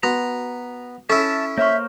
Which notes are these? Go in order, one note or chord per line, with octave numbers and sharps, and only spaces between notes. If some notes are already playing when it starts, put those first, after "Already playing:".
B3 F#4 A#5
C#4 E4 A4 E5 A5
A#3 C5 C#5 E5 C#6 F6